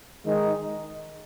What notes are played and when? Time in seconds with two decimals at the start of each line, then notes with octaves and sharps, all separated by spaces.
0.24 D#3 G#3 D#4